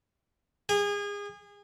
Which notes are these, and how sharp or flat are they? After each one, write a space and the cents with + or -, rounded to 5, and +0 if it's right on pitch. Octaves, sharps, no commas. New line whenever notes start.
G#4 -30